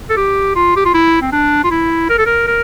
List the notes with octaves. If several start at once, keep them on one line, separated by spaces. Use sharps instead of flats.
A4
G4
F4
G4
F4
E4
C4
D4
F4
E4
A#4
A4
A#4
A#4